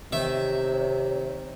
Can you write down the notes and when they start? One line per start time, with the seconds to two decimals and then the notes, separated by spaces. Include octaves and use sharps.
0.13 C3 D#3 C4 C#5 E5